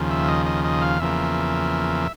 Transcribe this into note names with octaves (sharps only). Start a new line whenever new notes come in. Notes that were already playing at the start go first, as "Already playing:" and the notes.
Already playing: D#2 C#3 F3
E5
D#5
D#5
D#5
F5
E2 C#3 F3 A#3 E5